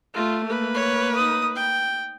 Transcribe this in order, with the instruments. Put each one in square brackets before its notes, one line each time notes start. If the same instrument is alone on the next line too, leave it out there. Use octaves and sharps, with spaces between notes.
[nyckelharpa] A3 [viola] F4
[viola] A#3 B4
[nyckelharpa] C#5
D#4 D#6
G5